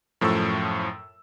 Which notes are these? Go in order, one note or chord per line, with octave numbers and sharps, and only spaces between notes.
F#2 A2 F3 A4 C#6 E6